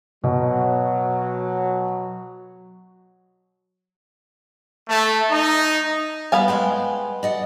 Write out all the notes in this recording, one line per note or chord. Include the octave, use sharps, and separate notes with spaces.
B2 F#3
A3
D#4
G3 B3 B4 F5 G#5
G#3 C5 G5
D5 D#5 F#5